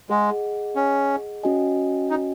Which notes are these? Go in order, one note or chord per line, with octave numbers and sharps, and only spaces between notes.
G#3 G#4 D#5 F#5
C#4
C#4 F#4 D#5 G#5
D#4